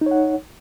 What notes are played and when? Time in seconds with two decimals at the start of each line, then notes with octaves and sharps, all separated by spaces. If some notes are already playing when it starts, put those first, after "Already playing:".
0.01 D#4
0.06 C#5
0.11 F#5